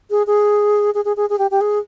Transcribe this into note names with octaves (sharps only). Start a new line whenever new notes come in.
G#4
G#4
G#4
G#4
G#4
G#4
G4
G4
G#4